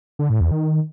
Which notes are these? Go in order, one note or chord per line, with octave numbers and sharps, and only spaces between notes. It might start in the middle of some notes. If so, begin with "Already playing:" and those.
D3
A2
E2
D#3